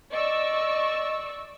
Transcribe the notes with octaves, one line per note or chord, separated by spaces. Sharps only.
D5 D#5 C#6 E6